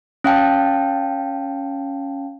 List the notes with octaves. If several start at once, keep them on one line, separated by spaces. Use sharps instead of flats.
C#4 F5 G5 A5